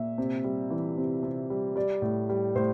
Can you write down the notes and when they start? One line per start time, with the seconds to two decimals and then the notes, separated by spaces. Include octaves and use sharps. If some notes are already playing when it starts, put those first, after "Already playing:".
Already playing: A#2 E5
0.18 C3
0.44 G3
0.70 E3
0.97 C3
1.23 C3
1.50 G3
1.76 G3 D5
2.02 A2
2.29 G3
2.55 A2 C5